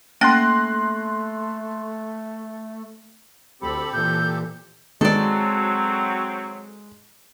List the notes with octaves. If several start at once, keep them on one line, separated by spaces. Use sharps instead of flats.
A3 A#3 C#4 G5 C6 F#6 A#6
D2 C4 G4 A4 B5
A#2 E3 G6
D#3 F#3 G#3 C4 A4 D5